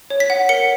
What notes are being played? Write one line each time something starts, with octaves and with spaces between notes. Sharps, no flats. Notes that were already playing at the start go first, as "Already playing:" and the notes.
C#5
B6
F#5
A#4 C#7